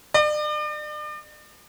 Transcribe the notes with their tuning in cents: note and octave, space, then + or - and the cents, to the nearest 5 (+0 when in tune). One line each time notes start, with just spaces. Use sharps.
D5 +40